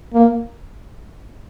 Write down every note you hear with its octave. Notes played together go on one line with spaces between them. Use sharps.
A#3